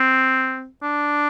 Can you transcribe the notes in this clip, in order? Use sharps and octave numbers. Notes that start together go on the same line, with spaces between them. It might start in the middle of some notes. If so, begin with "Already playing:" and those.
Already playing: C4
D4